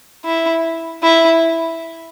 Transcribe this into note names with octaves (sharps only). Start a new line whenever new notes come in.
E4
E4